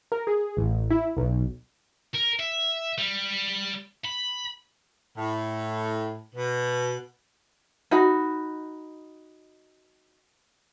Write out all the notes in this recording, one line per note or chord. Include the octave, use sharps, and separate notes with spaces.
A#4
G#4
A1
E4
B1
A#4
E5
G3
B5
A2
B2
D#4 F#4 B5